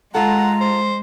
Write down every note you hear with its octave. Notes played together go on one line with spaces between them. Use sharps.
G#3 F4 A4 F#5 A#5
C5